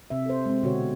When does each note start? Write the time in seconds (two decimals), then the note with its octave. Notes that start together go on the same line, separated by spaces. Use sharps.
0.10 C3 E5
0.26 A4 C5
0.46 G#3 C4
0.63 B2 D3 F#4 C#5